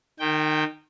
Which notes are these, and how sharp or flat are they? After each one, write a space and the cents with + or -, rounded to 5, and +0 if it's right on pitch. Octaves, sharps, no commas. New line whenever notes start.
D#3 -25 G5 +0